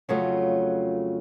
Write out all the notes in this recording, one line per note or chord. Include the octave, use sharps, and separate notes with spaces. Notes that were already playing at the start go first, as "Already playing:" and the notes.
F2 C#3 F#3 A3 F4